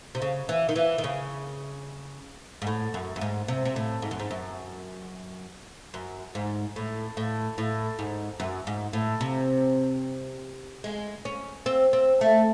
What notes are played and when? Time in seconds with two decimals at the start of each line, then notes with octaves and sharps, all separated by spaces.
0.15 C3
0.22 C#3
0.49 E3
0.69 D#3
0.76 E3
0.98 D#3
1.04 C#3
2.62 G#2
2.67 A2
2.94 F#2
3.16 F#2
3.21 G#2
3.48 C3
3.65 C3
3.76 A2
4.02 G#2
4.11 F#2
4.20 G#2
4.31 F#2
5.94 F#2
6.35 G#2
6.76 A2
7.17 A2
7.58 A2
7.99 G#2
8.40 F#2
8.67 G#2
8.93 A2
9.21 C3
10.84 G#3
11.25 C#4
11.66 C4
11.93 C4
12.21 A3